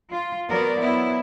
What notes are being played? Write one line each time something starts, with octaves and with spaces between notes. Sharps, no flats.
F4
F#3 B3 A#4 D5
F#3 B3 E4